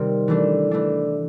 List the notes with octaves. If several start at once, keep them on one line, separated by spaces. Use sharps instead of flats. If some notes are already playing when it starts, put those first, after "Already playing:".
Already playing: C3 D#3 G3 C4
E3 A3 D4
E3 A3 D4